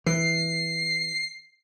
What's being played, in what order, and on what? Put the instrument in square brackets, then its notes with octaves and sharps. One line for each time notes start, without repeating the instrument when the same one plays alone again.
[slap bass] E3 [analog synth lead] C7